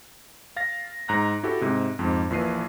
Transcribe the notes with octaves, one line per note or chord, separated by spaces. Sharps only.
F5 A6 A#6
G#2 A#5 F#6 A#6
E4 F#4 G4 A4
G#2 C3
F2 G#2
A#1 A#2 E3 C7 D#7